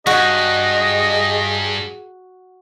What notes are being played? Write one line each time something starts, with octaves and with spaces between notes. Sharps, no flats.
G2 F#4 G#4 D#5